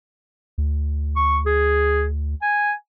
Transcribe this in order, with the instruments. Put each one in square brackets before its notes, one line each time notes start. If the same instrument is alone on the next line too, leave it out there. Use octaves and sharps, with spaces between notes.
[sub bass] D2
[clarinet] C#6
G#4
G#5